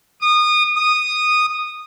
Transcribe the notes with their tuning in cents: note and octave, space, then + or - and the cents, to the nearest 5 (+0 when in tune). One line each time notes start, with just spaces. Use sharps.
D#6 -25
D#6 -10